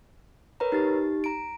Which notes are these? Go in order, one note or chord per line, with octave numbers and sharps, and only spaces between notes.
A#4 B4 C#5 A#5
D#4 G4 A6
A#5 D7